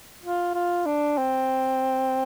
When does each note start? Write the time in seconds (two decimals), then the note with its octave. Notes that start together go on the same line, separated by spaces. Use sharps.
0.23 F4
0.55 F4
0.86 D4
1.18 C4